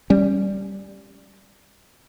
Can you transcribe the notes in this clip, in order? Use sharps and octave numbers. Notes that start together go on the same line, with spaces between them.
G3 C#4